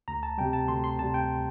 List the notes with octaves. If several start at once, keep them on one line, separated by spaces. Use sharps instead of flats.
D2 A#5
A5
C3 G3 G5
A5
D2 C6
C6
C3 G3 A5
G5